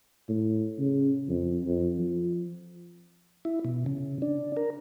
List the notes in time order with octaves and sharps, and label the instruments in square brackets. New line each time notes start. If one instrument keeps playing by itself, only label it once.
[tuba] A2
C#3
F2
F2
F3
[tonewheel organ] E4
B2
C#3
D4
A#4